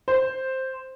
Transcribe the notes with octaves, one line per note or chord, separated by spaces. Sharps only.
C5